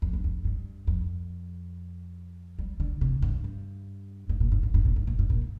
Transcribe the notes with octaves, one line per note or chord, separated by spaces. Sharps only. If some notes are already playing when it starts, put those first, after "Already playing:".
F2
G2
F2
G2
F2
G3
D3
C3
G2
G2
G2
A#2
G2
A#2
G2
A#2
G2
A#2
G2
A#2